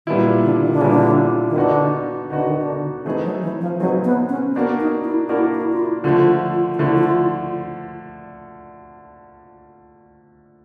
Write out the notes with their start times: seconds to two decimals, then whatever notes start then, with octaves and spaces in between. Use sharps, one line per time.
0.06 A#2 D#3 G3 B3 E4
0.44 D3
0.63 D#3
0.73 D3
0.81 A#2 C#3 G3 B3 E4
0.91 D3
1.50 D#3
1.55 D3 B3 D#4 F#4
2.30 D3 B3 D#4 F#4
2.45 D#3
2.58 D3
3.05 E3 A3 C4 D#4 G#4 B4
3.24 F#3
3.42 E3
3.61 F3
3.79 F#3 A3 C4 D#4 G#4 B4
4.04 B3
4.29 C#4
4.55 A#3 B3 D4 F#4 A#4
4.80 D#4
5.04 E4
5.29 A#3 D4 E4 F#4 A#4
5.54 E4
5.72 F4
5.80 E4
6.04 D3 F3 A3 F4
6.28 F4
6.54 F4
6.74 F4
6.79 D3 F3 A3 E4
6.97 E4
7.04 F4